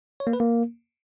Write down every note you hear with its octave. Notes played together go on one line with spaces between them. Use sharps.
C#5
A#3
B4
A#3